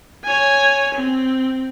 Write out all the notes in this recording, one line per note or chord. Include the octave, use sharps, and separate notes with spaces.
C#5 G#5
C4